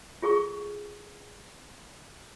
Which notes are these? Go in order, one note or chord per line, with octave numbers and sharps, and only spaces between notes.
F4 G#4 A4 C#6